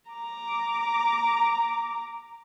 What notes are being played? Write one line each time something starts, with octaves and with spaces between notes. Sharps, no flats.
A#5 D6